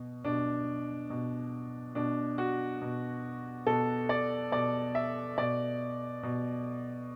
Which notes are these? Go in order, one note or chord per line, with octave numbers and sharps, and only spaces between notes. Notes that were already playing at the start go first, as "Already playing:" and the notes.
Already playing: B2
B2 D4
B2
B2 D4
F#4
B2
B2 A4
D5
B2 D5
E5
B2 D5
B2